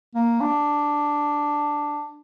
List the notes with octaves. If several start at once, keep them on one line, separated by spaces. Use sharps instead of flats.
A#3
D4